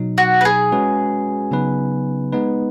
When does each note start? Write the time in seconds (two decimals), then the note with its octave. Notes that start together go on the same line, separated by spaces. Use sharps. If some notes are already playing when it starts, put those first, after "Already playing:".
Already playing: B2 F#3 D#4
0.18 F#4
0.41 B4
0.45 G#4
0.72 G#3 C#4 F#4 B4
1.51 C#3 F#3 B3 D#4 B4
2.33 G#3 B3 D#4 B4